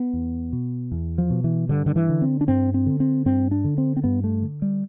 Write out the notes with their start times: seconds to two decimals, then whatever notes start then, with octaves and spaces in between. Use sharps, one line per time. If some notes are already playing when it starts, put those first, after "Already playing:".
Already playing: B3
0.13 E2
0.53 B2
0.92 E2
1.18 F3
1.30 B2
1.44 E3
1.69 G2 D3
1.86 D3
1.96 E3
2.09 D3
2.22 C4
2.41 D4
2.48 G2 C4
2.74 C4
2.86 D3
3.00 C4
3.26 G2 C4
3.51 D4
3.65 D3
3.78 C4
3.97 C4
4.04 G2 B3
4.24 A3
4.42 D3
4.62 G3